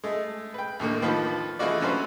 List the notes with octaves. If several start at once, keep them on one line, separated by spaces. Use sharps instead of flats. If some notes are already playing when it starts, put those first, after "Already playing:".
G#3 A3
B4 G5
D#2 A2 D3 A#3
D#3 F3 F4 B4
E3 G#3 A3 F4 F#4 D5
D3 F#3 C#4 F#4 B4 C5